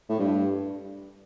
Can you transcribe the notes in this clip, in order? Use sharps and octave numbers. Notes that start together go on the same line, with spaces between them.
A2
G2